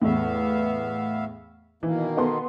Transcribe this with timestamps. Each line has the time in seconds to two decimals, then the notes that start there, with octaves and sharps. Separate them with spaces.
0.02 E2 A2 B3 E5 F5
1.83 B2 D#3 E3 A#3
2.17 B3 A4 C6